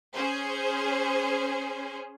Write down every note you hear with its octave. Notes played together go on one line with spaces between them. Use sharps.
C#4 G#4 C5